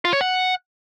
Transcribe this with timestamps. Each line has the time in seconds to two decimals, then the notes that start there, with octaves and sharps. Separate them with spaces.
0.05 F4
0.13 C#5
0.21 F#5